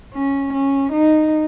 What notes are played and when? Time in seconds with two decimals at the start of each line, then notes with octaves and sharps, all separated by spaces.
0.14 C#4
0.53 C#4
0.93 D#4